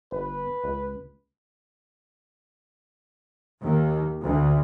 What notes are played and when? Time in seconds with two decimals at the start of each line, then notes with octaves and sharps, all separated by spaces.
0.12 G1 B4
0.64 C#2
3.61 D#2
4.24 D2